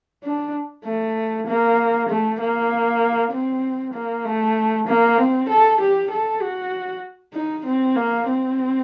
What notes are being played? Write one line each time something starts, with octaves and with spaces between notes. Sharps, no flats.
D4
A3
A#3
A3
A#3
C4
A#3
A3
A#3
C4
A4
G4
A4
F#4
D#4
C4
A#3
C4